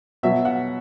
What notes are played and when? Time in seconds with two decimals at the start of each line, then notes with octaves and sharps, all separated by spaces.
0.23 B2 F#3 E5
0.45 F#5